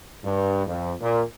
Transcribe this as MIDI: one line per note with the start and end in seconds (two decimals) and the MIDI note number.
0.24 0.65 43
0.67 0.94 41
1.01 1.22 46